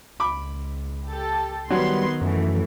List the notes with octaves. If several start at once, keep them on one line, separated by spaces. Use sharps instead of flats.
C#2 B5 D6
G4 A4
D#3 F#3 G3 B3 B4 C6
F#2 E3 A3